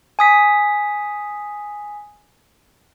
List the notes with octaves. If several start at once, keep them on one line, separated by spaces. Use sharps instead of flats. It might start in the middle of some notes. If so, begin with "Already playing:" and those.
G#5 D#6 B6